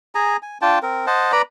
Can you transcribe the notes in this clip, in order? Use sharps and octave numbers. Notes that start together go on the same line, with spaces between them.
G#4 G#5 A#5
G#5
D4 F4 G5 A5
C4 A#4
C5 D#5 F#5 A5
B4 D5 A#5 B5